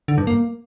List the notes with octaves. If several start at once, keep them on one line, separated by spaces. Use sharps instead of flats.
D3
G2
A#3